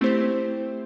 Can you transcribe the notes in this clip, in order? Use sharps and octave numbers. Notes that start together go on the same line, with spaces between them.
A3 C4 E4 G4 C5